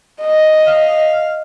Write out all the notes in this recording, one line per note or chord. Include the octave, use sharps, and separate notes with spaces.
D#5
F5